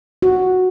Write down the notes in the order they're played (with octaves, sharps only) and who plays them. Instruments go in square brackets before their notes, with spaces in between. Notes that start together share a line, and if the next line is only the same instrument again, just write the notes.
[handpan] F#4